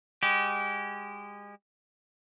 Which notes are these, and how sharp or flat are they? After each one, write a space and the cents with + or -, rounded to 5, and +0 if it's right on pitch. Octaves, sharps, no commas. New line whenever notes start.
G#3 -30 G4 -30